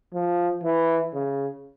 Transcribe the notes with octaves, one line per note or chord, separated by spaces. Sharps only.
F3
E3
C#3